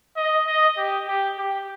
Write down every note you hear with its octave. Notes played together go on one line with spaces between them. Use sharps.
D#5
D#5
G4
G4
G4